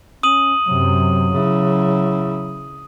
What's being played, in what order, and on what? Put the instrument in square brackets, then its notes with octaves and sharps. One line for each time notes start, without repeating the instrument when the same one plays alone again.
[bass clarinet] C#4 [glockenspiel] D#6 D#7 F#7
[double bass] F#2 C3 [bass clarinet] F#3
[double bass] C#3 E4